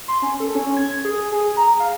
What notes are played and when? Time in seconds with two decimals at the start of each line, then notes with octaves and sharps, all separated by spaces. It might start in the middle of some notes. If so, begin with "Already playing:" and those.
0.08 C6
0.22 C#4
0.40 A4
0.55 C#4
0.77 G#6
1.05 G#4
1.32 G#4
1.57 A#5
1.80 F5